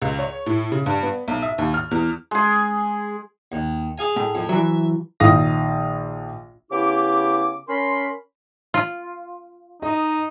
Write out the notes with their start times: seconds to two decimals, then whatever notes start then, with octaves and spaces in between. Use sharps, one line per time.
0.02 C#2
0.19 C#5
0.46 A2
0.72 C#3
0.86 G2
1.03 B3
1.28 B1
1.42 E5
1.58 D#2
1.74 F6
1.91 E2
2.31 G#3 G#4
3.52 D#2
3.98 G#4 F5 G#5
4.16 A2
4.35 F2
4.49 E3 F#3 E5
5.20 A#1 D#3 F5 D#6 A#6
6.71 C#3 B3 E4 G4 D6
7.69 C#4 A#4 B5 C6
8.74 F4
9.82 D#4 D#5